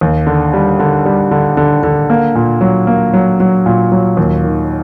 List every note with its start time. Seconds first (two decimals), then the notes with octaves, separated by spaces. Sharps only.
0.01 D#2
0.27 D3
0.54 G3
0.80 D3
1.06 G3
1.31 D3
1.57 D3
1.83 D3
2.10 A#3
2.35 A#2
2.61 F#3
2.87 A#3
3.14 F#3
3.40 F#3
3.66 A#2
3.92 F#3
4.17 D#2
4.44 D#3